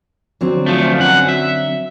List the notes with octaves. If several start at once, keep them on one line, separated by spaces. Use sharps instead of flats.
D3 F#3 C4
F3 A3
F#2 F#5
E5